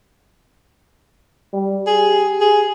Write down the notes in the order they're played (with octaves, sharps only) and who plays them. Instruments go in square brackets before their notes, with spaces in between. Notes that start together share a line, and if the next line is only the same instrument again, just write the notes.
[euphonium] G3
[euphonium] G4 [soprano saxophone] G#4
[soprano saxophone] G#4